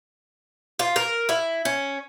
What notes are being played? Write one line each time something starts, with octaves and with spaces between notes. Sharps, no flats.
F4
A#4
E4
C#4